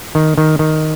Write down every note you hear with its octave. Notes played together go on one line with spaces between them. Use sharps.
D#3
D#3
D#3